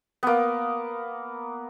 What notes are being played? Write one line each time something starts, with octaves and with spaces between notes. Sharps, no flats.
A#3 B3